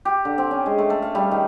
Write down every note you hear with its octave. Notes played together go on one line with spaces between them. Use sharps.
G4
D3
C4
C#4
G#3
A3
A3
F5
G3
D#3